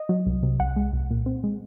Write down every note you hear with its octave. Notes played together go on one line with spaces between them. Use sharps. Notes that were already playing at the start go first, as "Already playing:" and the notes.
Already playing: D#5
F#3
C2
C3
C2 F#5
G#3
C2
A#2
C4
G#3